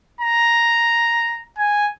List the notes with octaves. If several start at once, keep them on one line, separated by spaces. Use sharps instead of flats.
A#5
G#5